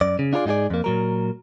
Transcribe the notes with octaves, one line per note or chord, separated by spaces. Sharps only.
F#2 D5
C#3
D4 F4 G#4 A4 D5
G#2 D#4 F#4 G#4 D5
F2 A#3
A#2 F#3 A#4